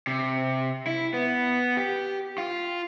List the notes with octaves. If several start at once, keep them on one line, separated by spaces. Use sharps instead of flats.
C3
E4
B3
G4
F4